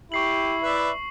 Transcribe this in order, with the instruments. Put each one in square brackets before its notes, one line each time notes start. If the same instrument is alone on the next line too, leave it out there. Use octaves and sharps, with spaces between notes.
[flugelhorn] E4 [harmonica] G4 [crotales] C#6 C7 F#7
[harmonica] B4 D5 E5